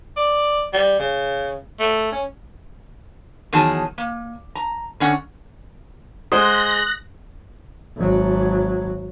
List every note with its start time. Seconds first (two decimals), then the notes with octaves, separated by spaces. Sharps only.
0.17 D5
0.73 G3
1.00 C#3
1.80 A3
2.12 C#4
3.53 E2 D#3 F#3 G#4 A5
3.98 A#3
4.55 A#5
5.00 D3 C#4 F#5
6.32 G#3 C5 F#5 D#6 F#6 A#6
7.97 G#1 F#3